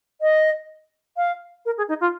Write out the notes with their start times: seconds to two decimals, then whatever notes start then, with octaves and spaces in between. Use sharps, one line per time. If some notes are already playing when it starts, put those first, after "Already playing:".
0.21 D#5
1.17 F5
1.65 A#4
1.77 G#4
1.88 D#4
2.01 F4